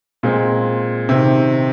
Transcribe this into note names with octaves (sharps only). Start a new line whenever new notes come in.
A#2 G#3 C4
C3 D#3 C4